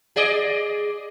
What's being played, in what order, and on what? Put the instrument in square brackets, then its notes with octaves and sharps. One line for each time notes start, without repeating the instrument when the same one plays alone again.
[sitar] G#4 D5 D#5